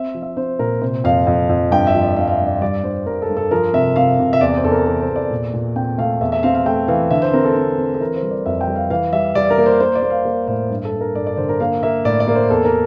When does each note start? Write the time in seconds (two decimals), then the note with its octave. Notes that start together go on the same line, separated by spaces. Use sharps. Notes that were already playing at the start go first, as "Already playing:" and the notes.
Already playing: C4 E5
0.14 F3
0.22 E5
0.37 C4 C5
0.59 A#2 A#4
0.81 C3 C5
1.04 F2 F5
1.27 F2
1.49 F2
1.71 G2 G5
1.87 E5
1.94 F3
2.02 D5
2.17 G2 F5
2.28 F5
2.32 E5
2.39 G2
2.47 D5
2.61 G3 D5
2.84 G2 C5
3.07 G2 A#4
3.22 A4
3.30 G2
3.37 A4
3.51 F3 A#4
3.74 C3 E5
3.96 C3 F5
4.19 C3
4.33 E5
4.41 E2 D5
4.57 C5
4.64 E2 A4
4.71 A#4
4.86 E3 A#4
5.01 C5
5.09 E2
5.16 D5
5.31 A#2
5.54 A#2
5.76 C4 G5
5.98 A3 F5
6.21 E2 E5
6.32 E5
6.43 C4 F5
6.55 F5
6.66 A3 G5
6.88 E3 F5
7.11 D3 E5
7.22 C5
7.33 C4 A#4
7.45 A4
7.56 C4
7.78 C4
7.95 A4
8.01 E3 A#4
8.16 C5
8.23 G3
8.31 D5
8.46 F2 E5
8.61 G5
8.68 G3
8.76 F5
8.90 E3 F5
9.13 G3 E5
9.35 G3 D5
9.50 A#4
9.58 A#3
9.66 C5
9.81 A#3 C5
9.95 D5
10.03 A#3
10.10 F5
10.25 A#3
10.47 A2 C5
10.70 G2
10.85 A4
10.93 G2
11.01 A#4
11.15 G2 D5
11.27 D5
11.37 D3 C5
11.49 A#4
11.60 A#3 F5
11.83 A#3 E5
12.05 A2 D5
12.20 D5
12.28 A#3
12.35 C5
12.50 E2 A4
12.65 A#4